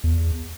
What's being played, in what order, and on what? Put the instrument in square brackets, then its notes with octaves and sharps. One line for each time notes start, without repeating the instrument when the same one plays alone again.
[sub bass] E2